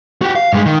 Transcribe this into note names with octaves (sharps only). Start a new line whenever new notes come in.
F#4 G4
F5
G2 G#3
D#3